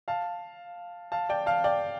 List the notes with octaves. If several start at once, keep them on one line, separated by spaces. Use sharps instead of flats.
F5 A5
F5 A5
D5 G5
F5 A5
D5 G5